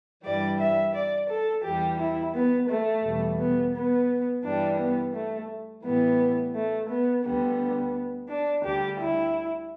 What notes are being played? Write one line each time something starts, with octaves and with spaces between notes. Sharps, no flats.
G2 E3 G3 D5
E5
D5
A4
E2 E3 G3 G4
E4
B3
A3
E2 B2 G3
B3
B3
G2 E3 G3 D4
B3
A3
A2 E3 G3 B3
A3
B3
D2 D3 G3 B3
D4
D2 D3 G3 G4
E4